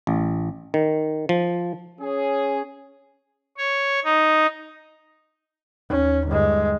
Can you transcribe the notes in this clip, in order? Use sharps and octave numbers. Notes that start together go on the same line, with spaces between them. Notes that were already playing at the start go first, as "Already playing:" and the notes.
A1
D#3
F3
C#4 G#4
C#5
D#4
D#2 C#4
G1 G#3